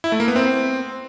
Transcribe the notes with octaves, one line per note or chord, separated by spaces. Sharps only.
E4
A3
A#3
B3
C4